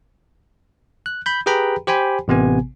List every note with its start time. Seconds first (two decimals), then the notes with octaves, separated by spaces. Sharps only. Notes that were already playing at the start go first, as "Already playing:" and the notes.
1.06 F#6
1.26 B5 G6
1.46 G4 G#4 B4 G5 A#5 B5
1.87 G4 C5 G5 G#5 B5
2.28 A1 C3 B3 G#5